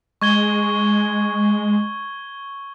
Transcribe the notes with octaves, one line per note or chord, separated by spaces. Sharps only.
G#3 C#6 G#6 G7